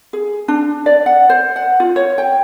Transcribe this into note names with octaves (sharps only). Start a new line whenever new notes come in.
G#4
D4
D5
F#5
C5
F#5
F4
C#5
G5